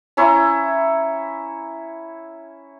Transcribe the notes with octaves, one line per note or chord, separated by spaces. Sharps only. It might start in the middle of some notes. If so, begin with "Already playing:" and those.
C#4 E4 C#5 A#5